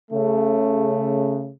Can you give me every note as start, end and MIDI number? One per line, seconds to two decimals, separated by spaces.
0.11 1.51 49
0.11 1.51 57